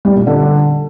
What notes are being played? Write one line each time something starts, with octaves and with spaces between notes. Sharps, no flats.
G3
A#2
D3